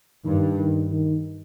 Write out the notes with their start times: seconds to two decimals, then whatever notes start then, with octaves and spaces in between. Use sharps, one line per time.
0.25 G2 D#3
0.58 D#3
0.92 D#3